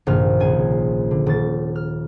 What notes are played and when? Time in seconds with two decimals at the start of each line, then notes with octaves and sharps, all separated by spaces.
0.07 A#1 G2 C3 D#3 F6
0.40 C#2 G#5
1.11 D3
1.26 D#1 A6
1.76 F6